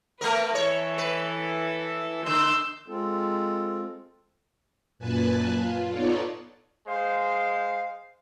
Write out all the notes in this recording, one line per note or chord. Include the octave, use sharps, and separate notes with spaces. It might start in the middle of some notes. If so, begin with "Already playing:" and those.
A3 B3 A#4 B4
E3 A4 C#5
B4
D3 C6 E6 G6
G#3 C4 F4 A4
F#2 A#2 B4 G#5 A5 F#6
F4
B3 D#4 F4 A4 C#5 D5
G#3 C5 F5